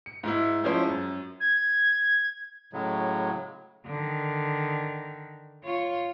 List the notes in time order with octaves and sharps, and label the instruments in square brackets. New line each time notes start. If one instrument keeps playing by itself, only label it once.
[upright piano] C#7
G#2 G#3 E4
F3 G#3 C#4 E4 C5
F#2
[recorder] G#6
[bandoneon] A2 C#3 F#3 G#3
[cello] D3 D#3
F4 C#5